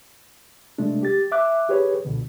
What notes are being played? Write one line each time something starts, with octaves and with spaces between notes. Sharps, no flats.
C3 G#3 A3 D4
G4 A6
E5 D6 F#6
G4 G#4 B4 C#5
C#2 B2 D3